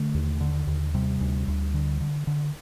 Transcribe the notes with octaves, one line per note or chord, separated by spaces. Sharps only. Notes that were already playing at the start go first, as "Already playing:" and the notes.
Already playing: D3 A3
D#2
D3
D#2
C3 G3
D2
D2
D3
D3
D3